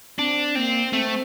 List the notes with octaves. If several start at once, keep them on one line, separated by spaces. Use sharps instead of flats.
C4 D4
A#3 C4
A3 C4